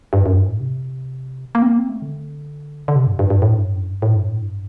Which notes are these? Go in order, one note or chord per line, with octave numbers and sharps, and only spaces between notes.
G2
F#2
G2
A2
C3
A#3
C4
A#3
C4
A3
D3
D3
C3
G2
G2
G2
A2
G2
F#2
G2
A2
G2
A2
G2